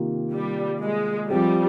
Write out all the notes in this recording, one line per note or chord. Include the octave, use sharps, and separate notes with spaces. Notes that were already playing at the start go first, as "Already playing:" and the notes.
Already playing: C3 D#3 A#3 F4
G3
G#3
F3 G3 C4 G4